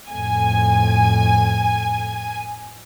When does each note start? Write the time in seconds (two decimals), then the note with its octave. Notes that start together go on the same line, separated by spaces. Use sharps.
0.11 F2 A2 G#5